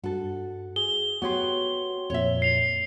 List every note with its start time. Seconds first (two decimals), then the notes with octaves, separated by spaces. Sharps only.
0.04 G2 F#4 A4
0.76 G#4 G7
1.22 B3 F#4 G4 C#5 C6
2.10 F2 A#2 C#5 E5
2.42 C7 F7